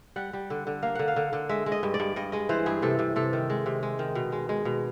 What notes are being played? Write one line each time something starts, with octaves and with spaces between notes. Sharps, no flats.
G3 F#5
G3
D3
D3
A#3 F5
D3 F#5
F5
D3
D3
G#3 E5
G#3
D#5
G2
D5
G2
G2 D#5
G#3 D#5
E3 C5
G2 G#4
C3 A4
C3
C3 A4
D#3
G#3
C3
G#3
D#3
B2
G#3
G#3
B2